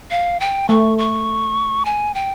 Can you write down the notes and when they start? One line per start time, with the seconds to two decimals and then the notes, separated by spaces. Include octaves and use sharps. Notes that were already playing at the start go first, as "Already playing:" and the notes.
0.11 F5
0.40 G5
0.69 A3 C#6
0.98 C#6
1.85 G#5
2.14 G5